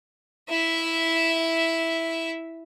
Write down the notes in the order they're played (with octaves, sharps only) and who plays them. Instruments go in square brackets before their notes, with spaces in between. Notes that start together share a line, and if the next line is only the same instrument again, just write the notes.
[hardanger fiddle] E4 E5